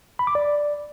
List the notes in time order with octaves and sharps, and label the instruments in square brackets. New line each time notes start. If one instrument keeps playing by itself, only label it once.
[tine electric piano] B5
D6
D5